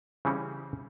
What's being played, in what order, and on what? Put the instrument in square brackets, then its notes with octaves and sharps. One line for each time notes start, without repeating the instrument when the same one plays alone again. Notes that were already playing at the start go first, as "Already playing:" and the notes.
[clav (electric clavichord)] C#3 E3 G3 C4 C#4